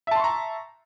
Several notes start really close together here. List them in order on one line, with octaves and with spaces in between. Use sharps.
E5 A5 C6 C#6 A#5